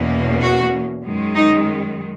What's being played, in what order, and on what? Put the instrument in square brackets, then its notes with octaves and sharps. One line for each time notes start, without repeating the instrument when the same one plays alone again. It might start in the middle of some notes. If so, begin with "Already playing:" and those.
Already playing: [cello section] E2 B2 A#3 C#4
F#4
F#2 D#3 G#3
D#4